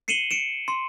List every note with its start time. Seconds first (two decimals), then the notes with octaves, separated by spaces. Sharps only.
0.08 C7 C#7 D#7 E7 F#7 G7
0.31 C#7 D7 E7
0.68 C6